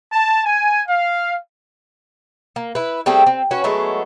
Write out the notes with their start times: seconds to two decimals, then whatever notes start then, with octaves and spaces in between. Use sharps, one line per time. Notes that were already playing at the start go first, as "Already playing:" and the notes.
0.13 A5
0.45 G#5
0.89 F5
2.56 A#3
2.75 E4 B4
3.06 G3 A3 C4 G#4
3.26 C4
3.51 C#4 F#4 B4 C#5
3.64 F#3 G#3 A3 B3